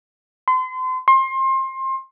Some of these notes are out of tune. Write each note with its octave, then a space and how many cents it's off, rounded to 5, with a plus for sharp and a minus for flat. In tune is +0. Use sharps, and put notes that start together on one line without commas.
C6 -35
C6 +25